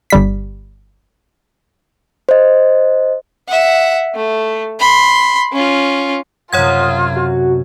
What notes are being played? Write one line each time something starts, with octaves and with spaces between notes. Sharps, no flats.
G1 G3 B6
C5 D#5
E5 F#5
A3
B5 C6
C#4 F4
F#2 C3 F4 C#5 F#5 D#6 G#6
F#4